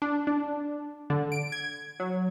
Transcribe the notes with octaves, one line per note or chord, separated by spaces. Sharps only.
D4
D4
D3
D7
G#6
F#3